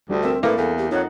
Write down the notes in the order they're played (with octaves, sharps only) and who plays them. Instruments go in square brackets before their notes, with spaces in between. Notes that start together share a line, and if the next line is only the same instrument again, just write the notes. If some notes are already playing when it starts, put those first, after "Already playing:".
[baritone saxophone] D2 [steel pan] G3 D4 G4
[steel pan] C4 E5 [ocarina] A#4
[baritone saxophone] A2 [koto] A#3 [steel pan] E4 [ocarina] B4
[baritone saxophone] E2 [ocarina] A4
[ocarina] G4
[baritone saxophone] F2 [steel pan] D#4 F#5 [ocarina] C#5